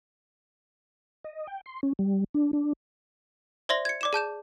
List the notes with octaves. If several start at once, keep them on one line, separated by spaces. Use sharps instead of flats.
D#5
G5
C6
C#4
G3
D4
D4
C5 D5 E5 C6 A#6
G#6 C#7
D5 D6 E7
G#4 A5 G6 E7